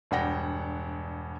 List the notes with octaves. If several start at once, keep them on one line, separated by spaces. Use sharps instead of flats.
E1 G2 D5 F#5 G5 A#6